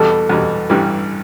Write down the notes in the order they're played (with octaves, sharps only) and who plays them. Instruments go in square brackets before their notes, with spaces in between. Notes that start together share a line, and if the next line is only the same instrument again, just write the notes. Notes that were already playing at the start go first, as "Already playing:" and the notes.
Already playing: [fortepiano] E2 B2 G3 [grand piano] A4
[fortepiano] E2 B2 G3
A1 G2 E3 G3